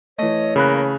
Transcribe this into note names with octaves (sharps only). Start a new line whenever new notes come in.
E3 A3 C#5 D#5
C#3 A#3 B5 F#6